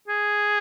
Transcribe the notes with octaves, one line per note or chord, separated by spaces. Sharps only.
G#4